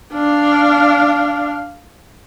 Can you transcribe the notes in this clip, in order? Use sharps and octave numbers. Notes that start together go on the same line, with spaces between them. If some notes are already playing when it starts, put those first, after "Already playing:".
D4 F5